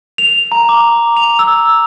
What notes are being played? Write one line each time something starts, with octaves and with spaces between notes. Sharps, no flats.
F7
A#5
D6
F7
E6